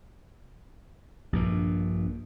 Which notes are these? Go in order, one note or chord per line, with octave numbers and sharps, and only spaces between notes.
A#1 G2 A#2